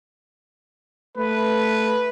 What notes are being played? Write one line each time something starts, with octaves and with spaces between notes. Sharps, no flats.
A3 B4